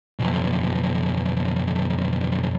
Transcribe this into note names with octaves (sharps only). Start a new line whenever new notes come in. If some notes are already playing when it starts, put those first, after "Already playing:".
B1 F2